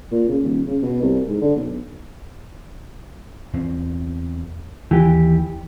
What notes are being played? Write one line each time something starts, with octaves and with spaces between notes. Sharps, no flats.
A#2
C#3
D#1
C#3
B2
C2
G#2
D3
B1
E2 C4
D#2 E3 G4